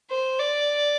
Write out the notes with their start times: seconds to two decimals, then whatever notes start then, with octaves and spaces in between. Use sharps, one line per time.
0.11 C5
0.39 D5